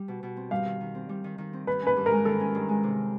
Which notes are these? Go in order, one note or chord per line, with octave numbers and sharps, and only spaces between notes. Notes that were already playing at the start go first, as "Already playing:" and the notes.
Already playing: G3
B2
B2
C4
G3 F5
D#3
D#3
C4
G3
D#3
D#3
C4
D#3 B4
C#4
B4
G2
A#4
G#3
D#3 A4
C#4
G2
G#3
C3